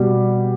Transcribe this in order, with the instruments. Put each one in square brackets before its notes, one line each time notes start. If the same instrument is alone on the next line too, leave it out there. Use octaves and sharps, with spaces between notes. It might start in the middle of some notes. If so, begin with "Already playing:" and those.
Already playing: [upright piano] B2 G3